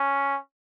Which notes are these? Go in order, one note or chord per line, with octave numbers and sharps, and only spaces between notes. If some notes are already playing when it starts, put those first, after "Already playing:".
Already playing: C#4